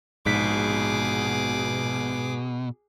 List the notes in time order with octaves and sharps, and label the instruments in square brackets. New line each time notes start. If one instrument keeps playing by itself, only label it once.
[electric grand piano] A#1 B6 [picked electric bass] G#2 [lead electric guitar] B2 [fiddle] G#4 D6